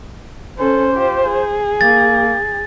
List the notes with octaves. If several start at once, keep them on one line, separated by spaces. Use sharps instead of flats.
C#4 A4 C5
F4 G4
G#4
A#3 A6